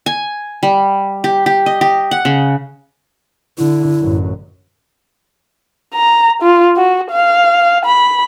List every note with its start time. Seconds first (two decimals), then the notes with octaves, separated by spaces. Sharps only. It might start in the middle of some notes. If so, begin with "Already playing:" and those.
0.06 G#5
0.63 G3
1.24 G4
1.46 G4
1.66 D#5
1.81 G4
2.11 F#5
2.25 C#3
3.58 D3 E4
4.01 A1 F#2
5.95 A#5
6.42 F4
6.77 F#4
7.11 F5
7.85 B5